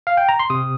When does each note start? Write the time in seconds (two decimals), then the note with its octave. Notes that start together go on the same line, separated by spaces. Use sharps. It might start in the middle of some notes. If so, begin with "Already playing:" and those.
0.07 F5
0.17 G5
0.29 A#5
0.39 C6
0.50 C3 D#6